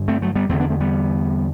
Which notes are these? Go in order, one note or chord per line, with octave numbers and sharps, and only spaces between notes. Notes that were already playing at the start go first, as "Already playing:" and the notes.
Already playing: G2 D3
A3 C4
F#3 A3
G3 B3
E2 D3 A3 C4
B3 D4
A3 C4
G3 B3